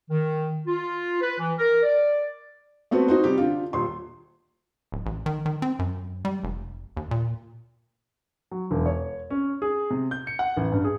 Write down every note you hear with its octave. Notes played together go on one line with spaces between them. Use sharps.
D#3
F4
B4
E3
A#4
D5
A3 B3 C4 F#4
D#4 F#4 C5
C3 G3 G4
D3 F4
D#1 C6
D1
A1
D#3
D#3
C4
F#2
G3
F1
D#2
A#2
F#3
E1
C#5
C#4
G#4
C3
G6
C#7
F#5
A1
G2
G#4